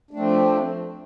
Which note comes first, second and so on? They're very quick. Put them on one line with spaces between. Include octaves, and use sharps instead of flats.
D4 A3 C4 F3